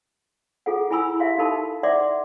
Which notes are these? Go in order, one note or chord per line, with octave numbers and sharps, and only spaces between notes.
F4 G#4 A4 F#5
E4 G#5 B5 E6
G4 E5 F5 C6
D#4 G4 A4 A#4 A5 B5
D5 E5 F#5 C6 D6